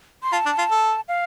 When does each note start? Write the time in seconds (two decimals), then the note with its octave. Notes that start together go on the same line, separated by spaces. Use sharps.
0.23 C6
0.33 F4 A5
0.46 D4
0.59 F4
0.71 A4
1.08 F5